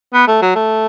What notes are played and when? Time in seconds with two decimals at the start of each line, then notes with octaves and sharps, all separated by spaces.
0.14 B3
0.28 A3
0.42 F#3
0.55 A3